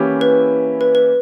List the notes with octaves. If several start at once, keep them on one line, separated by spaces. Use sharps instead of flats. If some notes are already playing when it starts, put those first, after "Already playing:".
Already playing: E3 A#3 C#4 E4 G4
B4
B4
B4